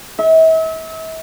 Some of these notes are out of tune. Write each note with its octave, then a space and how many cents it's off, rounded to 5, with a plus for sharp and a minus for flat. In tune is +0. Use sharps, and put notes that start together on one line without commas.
E5 -40